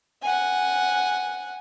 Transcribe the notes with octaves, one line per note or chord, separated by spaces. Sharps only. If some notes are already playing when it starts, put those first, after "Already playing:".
F#5 G#5